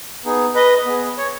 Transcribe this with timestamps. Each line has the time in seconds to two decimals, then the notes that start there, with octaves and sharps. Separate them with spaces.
0.25 B3 D#4 G#4
0.55 B4 D#5
0.86 B3 G#4
1.18 C#5